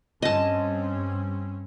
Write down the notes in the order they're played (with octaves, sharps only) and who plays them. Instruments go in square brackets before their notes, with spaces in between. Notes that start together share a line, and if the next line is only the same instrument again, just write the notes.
[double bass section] G2 C4 C#4 [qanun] D#5 A5